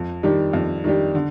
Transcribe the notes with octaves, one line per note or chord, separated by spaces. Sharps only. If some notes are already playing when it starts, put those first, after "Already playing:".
Already playing: F2
D#3 G3 D4 G4
F2
D#3 G3 D4 G4
D3